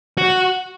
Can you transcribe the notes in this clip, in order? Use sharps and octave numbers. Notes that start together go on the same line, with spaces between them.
F#4